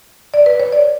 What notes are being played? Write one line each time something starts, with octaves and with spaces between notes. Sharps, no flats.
D5
B4
C#5
D5